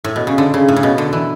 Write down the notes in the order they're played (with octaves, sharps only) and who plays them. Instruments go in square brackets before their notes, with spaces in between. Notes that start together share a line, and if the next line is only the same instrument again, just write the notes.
[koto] A2
B2
C#3
D3
C#3
A2
C#3
B2
D3
E3